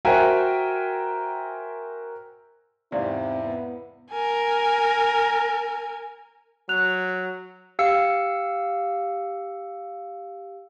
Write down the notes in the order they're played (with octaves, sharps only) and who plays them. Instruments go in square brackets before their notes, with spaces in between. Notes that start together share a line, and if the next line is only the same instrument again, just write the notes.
[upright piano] F#4 A#4 C5 E5 G5 G#5
[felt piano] E2 G#2 C3 [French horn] C4 [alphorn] E4 [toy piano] D5 F5 C6
[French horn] B3
[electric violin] A#4 G#5
[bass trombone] F#3 [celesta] F#6 F7
[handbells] G4 F5 E6 C#7